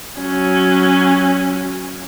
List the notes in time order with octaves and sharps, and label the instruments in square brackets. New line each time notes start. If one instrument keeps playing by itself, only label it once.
[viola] F#3 C#4